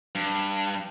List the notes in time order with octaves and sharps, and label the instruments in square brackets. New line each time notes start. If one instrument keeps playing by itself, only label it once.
[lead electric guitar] G2